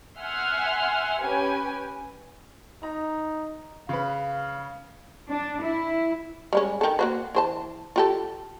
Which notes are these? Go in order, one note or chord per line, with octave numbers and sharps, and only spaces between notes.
E5 F#5 G#5 C6 F6
C#4 G4 B4 G#5
D#4 A#5
C#3 B4 F5
D4
E4
G3 G#3 C#4
D#3 A4
A#3 F#4 C5
E3 C5 A5
F4 G4 A4